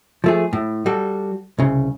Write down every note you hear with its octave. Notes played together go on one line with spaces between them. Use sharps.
F3 A3 G#4
A2
G3 F#4 A4
C2 C#3